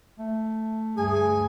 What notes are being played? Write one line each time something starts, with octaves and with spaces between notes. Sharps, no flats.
A3
D2 G2 G#4 G#5